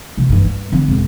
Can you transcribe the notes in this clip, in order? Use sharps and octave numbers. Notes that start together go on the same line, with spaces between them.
C3
G2 E3
G2
D3 C4
E1